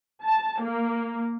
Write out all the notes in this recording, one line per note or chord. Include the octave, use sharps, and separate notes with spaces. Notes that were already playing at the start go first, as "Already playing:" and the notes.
A5
A#3